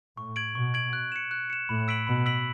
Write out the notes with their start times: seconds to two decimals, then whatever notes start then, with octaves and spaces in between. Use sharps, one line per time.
0.17 A2 C#6
0.36 G#6 D7 F#7
0.55 B2 C#6
0.74 G#6 D7 F#7
0.93 F#6
1.12 C#7 E7
1.31 F#6
1.50 C#7 E7
1.68 A2 B5
1.88 E6 B6 D7 F#7
2.07 B2 B5
2.26 E6 B6 D7 F#7